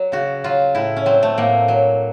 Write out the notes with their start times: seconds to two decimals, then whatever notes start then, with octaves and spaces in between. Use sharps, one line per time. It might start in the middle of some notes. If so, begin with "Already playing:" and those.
Already playing: F#3
0.12 C#3 F#4
0.44 F#3 F4
0.75 A2 E4
0.96 C#4
1.06 F#3 C4
1.23 A3
1.38 A2 A#3
1.68 F#3